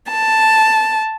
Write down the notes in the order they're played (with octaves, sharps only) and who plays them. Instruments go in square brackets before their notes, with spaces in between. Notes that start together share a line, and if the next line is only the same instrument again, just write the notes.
[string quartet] A5